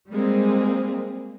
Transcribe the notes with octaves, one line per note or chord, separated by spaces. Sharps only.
G3 G#3 A#3 C4